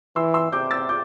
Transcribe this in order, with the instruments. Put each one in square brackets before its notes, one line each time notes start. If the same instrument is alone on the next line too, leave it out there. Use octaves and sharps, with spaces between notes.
[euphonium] E3 [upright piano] C6 E6
[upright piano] C6 E6
[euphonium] C3 [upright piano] D6 G6
[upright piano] E6 A6
D6 G6